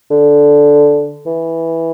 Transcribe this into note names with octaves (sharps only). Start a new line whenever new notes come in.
D3
E3